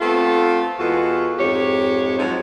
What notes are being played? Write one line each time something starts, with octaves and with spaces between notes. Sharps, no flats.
A3 B3 C4 F4 A4
E2 G#3 F4 F#4 A4 B4
F2 G#2 G#3 G4 C#5
F3 F#3 G#3 C4 D#4